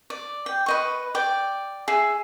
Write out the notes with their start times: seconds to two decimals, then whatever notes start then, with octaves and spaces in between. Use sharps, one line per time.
0.10 D5
0.46 G5
0.66 B4 D#5 C#6
1.15 D5 G5
1.88 G#4 E5